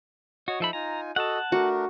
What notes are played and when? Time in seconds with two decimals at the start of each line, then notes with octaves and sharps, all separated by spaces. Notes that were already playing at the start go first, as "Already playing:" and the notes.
0.48 F#4 C#5 D#5
0.60 F3 D#4 A4 E5 B5
0.73 D#4 F4 G#5 A#5
1.16 F#4 A4 D#5 F#5 A5
1.52 A3 D4 F#4 A#4